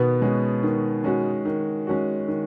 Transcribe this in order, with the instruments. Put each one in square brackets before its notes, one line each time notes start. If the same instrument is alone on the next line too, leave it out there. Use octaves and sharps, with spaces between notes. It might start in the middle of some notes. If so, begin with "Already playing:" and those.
Already playing: [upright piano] B2 B3 [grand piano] D#3
[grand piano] G#3 C#4 F#4
D#3
G#3 C#4 F#4
D#3
G#3 C#4 F#4
D#3